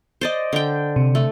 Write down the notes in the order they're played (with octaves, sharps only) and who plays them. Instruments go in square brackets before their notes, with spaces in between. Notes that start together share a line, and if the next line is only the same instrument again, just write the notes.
[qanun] C5 D5 D#5
D3 G5
[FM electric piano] C3
[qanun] A3